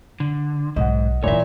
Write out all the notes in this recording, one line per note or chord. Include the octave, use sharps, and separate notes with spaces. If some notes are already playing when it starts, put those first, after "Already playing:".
D3
B1 G#2 D#5 F#5
A#2 E3 G#3 A#3 C#5 E5